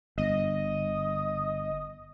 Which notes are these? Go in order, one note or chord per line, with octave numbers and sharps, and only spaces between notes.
G1 D#5